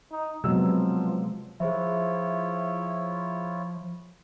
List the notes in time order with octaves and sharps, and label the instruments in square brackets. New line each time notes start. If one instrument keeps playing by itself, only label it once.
[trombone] D#4
[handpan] C3 B3 [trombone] F3 [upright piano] F#3 E6 [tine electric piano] G#3
[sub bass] F3 [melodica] E4 F4 C#5 [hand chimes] G#4 C5 E5